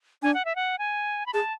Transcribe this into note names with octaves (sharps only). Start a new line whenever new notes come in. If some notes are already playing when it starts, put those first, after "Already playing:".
D4 G#5
F#5
E5
F#5
G#5
B5
G#4 A5